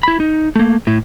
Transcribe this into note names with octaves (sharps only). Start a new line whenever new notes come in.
E4 B5
D#4
A3 A#3
A2 E4